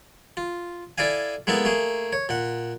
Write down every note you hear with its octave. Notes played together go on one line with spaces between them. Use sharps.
F4
E4 A4 D5 F5 G#5
G#3 A#3 B3 E4 A4
A3 A#3 G#4
C#5
A#2 F#5